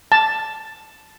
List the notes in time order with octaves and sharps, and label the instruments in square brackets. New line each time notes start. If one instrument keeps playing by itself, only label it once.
[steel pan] A5